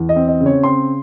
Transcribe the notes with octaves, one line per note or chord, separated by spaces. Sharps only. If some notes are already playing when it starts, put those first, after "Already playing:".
Already playing: E2
D#5
C4
D#5
C#3
C#5
C4 C6